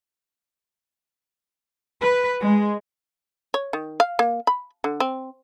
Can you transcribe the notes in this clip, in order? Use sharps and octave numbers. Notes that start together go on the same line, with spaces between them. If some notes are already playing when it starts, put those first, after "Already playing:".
B4
G#3
C#5
D#3
F5
A#3
B5
D3
C4